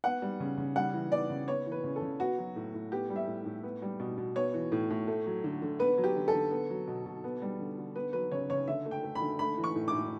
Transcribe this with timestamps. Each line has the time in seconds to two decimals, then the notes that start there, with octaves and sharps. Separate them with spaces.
0.04 B3 F#5
0.22 G3
0.40 C#3
0.57 C#3
0.76 G3 F#5
0.94 E3
1.12 B3 D5
1.30 C#3
1.47 B3 C#5
1.66 E3
1.72 B4
1.84 C#3
1.96 A4
2.02 C#3
2.20 B3 F#4
2.38 F#3
2.56 A2
2.74 A2
2.92 B3 G4
3.10 G3
3.16 E5
3.27 A2
3.46 A2
3.63 B3
3.82 G3
4.00 B2
4.18 B2
4.36 B3 C#5
4.54 E3
4.72 A2
4.90 A2
5.07 A3
5.26 F#3
5.44 D3
5.62 D3
5.79 B3 B4
5.98 F#3
6.04 G4
6.16 D3
6.28 A4
6.34 D3
6.51 B3
6.70 F#3
6.88 B2
7.06 B2
7.24 B3
7.42 G3
7.59 D3
7.78 D3
7.96 B3 B4
8.13 F#3 B4
8.32 C#3 C#5
8.50 C#3 C#5
8.68 D3 E5
8.85 A3
8.91 G5
9.03 A3
9.15 B5
9.21 D3
9.39 A3 B5
9.58 E3
9.64 C#6
9.76 A2
9.88 D6
9.93 A2